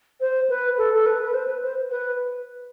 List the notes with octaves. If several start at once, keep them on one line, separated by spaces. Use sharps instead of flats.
C5
B4
A4
A4
B4
B4
C5
B4
C5
B4